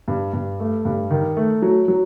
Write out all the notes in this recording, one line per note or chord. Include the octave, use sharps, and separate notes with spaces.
G2
G2
A3
G2
D#3
A3
F#3
F#3